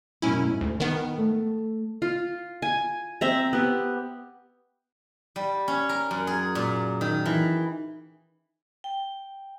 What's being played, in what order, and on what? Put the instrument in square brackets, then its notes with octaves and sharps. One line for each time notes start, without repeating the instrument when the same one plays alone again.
[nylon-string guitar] F#2 B2 [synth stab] C#4 E4
[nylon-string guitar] G#2
[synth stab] D2
D#3 B3
[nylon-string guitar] A3
[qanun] F4
G#5
C4 E5 A#5
B3 G4
[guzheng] G3
C#4
A#4
F#2
G#4
A#2
D#3
E3
[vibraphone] G5